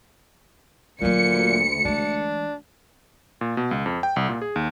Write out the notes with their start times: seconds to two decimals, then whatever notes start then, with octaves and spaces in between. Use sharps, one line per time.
1.02 D2 A#2 F#3 A#3 C#7
1.85 E3 G#3 D4
3.41 A#2
3.57 B2
3.71 C#2
3.86 F2
4.03 G5
4.16 C2
4.29 A#2
4.42 G#4
4.56 D#2